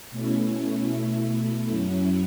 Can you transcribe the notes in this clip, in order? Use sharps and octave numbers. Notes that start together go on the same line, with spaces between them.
B2 A3 C#4 E4
B2 A3 E4
F#2 F#3 C#4 E4